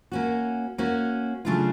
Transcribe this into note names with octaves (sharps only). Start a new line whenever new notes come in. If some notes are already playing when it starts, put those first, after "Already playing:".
A#3 C#4 F#4
A#3 C#4 F#4
C#3 F#3 A3 D4 F4